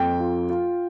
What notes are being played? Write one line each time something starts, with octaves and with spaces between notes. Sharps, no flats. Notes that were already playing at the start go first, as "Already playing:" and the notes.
Already playing: F2 G5
F4
F4